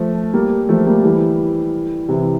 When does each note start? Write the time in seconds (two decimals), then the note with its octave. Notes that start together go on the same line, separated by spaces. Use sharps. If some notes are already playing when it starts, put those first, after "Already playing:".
Already playing: F3 A3
0.34 G3 A#3
0.69 F3 A3
0.87 G3 A#3
1.04 E3 G3
2.08 C3 E3